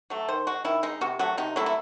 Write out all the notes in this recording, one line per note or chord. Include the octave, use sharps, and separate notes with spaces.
F#3 A3
D#3 C5
G#3 F#4
D#3 E4
G#3 D#4
C3 F#4
F#3 A3 F#4
C3 D#4
F#3 A3 E4
E4